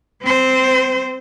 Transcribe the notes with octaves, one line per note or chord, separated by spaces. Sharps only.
C4 C5